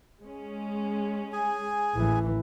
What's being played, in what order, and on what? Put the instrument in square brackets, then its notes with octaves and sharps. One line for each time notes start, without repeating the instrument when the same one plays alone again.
[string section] G#3 C#4
[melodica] G#4 G#5
[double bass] A1 E3 [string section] D#2